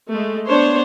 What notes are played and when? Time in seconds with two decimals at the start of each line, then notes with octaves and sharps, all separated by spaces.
0.12 G#3 A3
0.47 B3 D4 C5 C#5